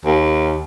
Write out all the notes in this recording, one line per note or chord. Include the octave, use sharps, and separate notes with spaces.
D#2